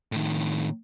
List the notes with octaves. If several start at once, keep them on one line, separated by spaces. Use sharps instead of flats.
A2 D#3